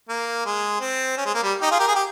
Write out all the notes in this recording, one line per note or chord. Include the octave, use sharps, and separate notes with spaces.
A#3
G#3
C4
C#4
G#3
A#3
G3
D#4 G4
F4 G#4
G4 A#4
G#4
G4